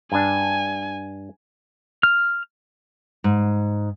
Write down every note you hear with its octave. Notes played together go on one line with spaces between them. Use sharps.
G2 D4 G#5
F6
G#2